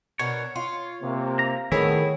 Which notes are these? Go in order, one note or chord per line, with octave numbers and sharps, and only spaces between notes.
B2 D4 A#4 C#5
F4
C3 A#3
A#5
A2 D#3 A3 B3 C4 E4 G#4 C#5